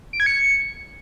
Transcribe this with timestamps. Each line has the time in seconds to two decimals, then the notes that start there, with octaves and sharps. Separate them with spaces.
0.13 D7
0.20 G#6
0.26 C#7